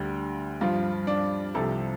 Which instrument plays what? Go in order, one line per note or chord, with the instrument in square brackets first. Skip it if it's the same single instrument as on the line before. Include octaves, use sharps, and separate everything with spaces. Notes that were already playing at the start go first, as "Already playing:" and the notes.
Already playing: [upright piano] D2 D3 G3
G2 F3 F4
D4
C2 C3 F3 A4